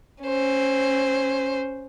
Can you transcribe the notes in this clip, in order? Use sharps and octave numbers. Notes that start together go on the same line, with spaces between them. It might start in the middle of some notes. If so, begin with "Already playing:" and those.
C#4 C5